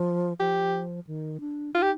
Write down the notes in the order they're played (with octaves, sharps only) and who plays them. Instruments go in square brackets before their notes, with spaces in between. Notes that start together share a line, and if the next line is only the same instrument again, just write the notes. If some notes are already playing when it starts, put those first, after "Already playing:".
Already playing: [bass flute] F3
[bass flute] F3 [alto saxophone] G4
[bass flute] D#3
D4
[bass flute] D#4 [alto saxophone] F4
[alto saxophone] G4